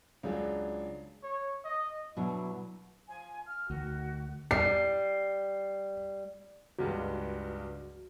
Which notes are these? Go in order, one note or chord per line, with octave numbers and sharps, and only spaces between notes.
C#2 F#3 D4 G#4
C#5
D#5
B2 F#3 D4 E4
F3 G#5
F6
D2 D#3 F#4
G3 C7
C#2 G2 G#3 F#4